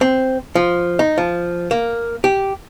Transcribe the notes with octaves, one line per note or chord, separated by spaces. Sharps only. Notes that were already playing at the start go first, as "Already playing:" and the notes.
C4
F3
D#4
F3
A#3
G4